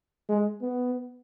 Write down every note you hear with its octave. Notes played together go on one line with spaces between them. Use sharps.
G#3
B3